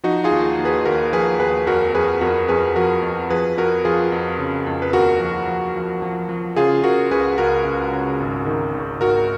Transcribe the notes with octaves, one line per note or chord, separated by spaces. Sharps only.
F3 D#4 F#4
F4 G#4
D#2
D#2
G#4 B4
D#2 F#4 A#4
F3 G#4 B4
D#2 G#4 B4
F2 F#4 A#4
F2 G#4 B4
F2 F#4 A#4
F2 G#4 B4
F3 F#4 A#4
F2
F3 G#4 B4
F2 F#4 A#4
F3 F4 G#4
F2
C#3
F2
B4
D#2 F#4 A#4
F3
F3
F3
F3
F3
C#3 F4 G#4
C#3 F#4 A#4
C#2 G#4 B4
C#2 F#4 A#4
C#2
C#3
G#1
D#3
G#1
G#1 F#4 A#4